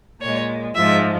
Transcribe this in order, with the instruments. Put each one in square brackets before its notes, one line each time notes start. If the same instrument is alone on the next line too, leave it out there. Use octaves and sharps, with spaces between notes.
[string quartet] A#2 G#3 C#5
G#2 F3 G#3 E5